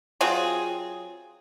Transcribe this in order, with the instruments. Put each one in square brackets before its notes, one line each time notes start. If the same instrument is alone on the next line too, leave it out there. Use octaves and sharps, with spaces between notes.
[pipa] F#3 C4 F4 G#4